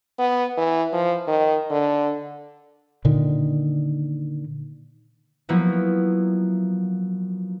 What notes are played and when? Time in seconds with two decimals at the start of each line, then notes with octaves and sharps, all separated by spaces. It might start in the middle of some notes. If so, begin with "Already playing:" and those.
0.19 B3
0.57 E3
0.93 F3
1.28 D#3
1.71 D3
3.05 A#2 D3 D#3
5.49 F3 F#3 A#3 B3 E4